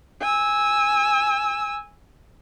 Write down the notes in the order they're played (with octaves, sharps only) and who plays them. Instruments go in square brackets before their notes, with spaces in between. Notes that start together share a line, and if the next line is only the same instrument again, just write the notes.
[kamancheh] G#5 E6